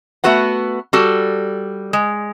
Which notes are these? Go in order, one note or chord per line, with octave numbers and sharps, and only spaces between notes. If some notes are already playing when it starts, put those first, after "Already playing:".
A3 B3 F#4 B4 F#5
G3 F#4 A4
G#3